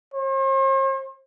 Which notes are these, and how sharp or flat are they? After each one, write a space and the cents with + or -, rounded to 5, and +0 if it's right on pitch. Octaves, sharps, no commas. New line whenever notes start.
C5 +45